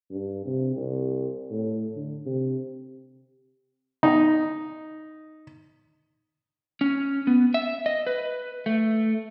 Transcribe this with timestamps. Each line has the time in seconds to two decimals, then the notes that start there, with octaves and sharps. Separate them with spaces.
0.10 G2
0.46 C3
0.76 C2
1.51 A2
1.96 D3
2.26 C3
4.03 D#4
6.81 C#4
7.27 B3
7.54 E5
7.86 D#5
8.07 B4
8.66 A3